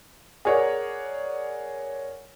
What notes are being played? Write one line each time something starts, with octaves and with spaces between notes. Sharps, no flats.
G#4 A#4 C#5 D5 F#5